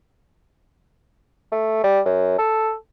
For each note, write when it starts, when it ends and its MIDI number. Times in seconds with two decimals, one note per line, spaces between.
1.52 1.83 57
1.84 2.00 55
2.05 2.35 42
2.38 2.74 69